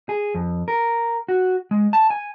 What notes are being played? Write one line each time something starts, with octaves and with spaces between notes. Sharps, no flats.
G#4
F2
A#4
F#4
G#3
A5
G#5